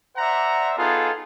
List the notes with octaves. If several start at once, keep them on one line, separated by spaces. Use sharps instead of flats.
C5 D5 E5 F#5 A#5
B3 D#4 F4 G#4 A4